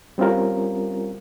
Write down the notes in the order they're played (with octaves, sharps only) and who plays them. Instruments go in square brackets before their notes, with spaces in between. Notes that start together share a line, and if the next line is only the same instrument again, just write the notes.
[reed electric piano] G3 C4 C#4 F4 A#4